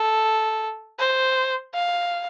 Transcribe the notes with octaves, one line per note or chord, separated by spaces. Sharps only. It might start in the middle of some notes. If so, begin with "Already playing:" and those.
Already playing: A4
C5
F5